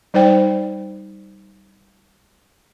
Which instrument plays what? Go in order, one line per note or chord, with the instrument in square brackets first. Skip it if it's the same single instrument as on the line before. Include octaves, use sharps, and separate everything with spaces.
[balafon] G3 D#4 C5 D5 G5